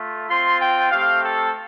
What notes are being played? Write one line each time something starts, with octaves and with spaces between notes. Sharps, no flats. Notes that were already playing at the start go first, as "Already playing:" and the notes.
Already playing: A3 F4
C4 F4 C6
G5
A3 C4 G4 F5
A4